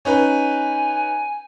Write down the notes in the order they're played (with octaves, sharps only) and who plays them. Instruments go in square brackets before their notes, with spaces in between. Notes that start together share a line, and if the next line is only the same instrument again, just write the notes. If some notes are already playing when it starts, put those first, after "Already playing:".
[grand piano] C#4 D#4 B4 [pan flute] G#5